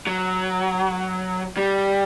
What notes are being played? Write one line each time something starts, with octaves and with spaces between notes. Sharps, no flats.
F#3
G3